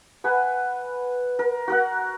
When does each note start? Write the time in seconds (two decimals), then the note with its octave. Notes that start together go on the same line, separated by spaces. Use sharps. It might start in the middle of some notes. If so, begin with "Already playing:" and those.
0.24 B4 F#5 G#5 B5
1.39 A#4
1.68 F#4 A#4 F#5